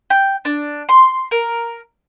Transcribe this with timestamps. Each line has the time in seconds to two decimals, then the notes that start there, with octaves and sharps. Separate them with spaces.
0.10 G5
0.45 D4
0.89 C6
1.31 A#4